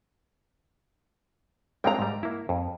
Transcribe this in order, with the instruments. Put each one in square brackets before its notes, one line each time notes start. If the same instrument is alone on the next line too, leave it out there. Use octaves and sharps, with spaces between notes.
[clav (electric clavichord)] G3 G#3 C4 [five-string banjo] G5 A#5
[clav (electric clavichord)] G#2 G3
A#3 E4
F2